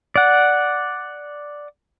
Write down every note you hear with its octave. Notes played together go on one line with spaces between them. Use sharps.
D5 F#5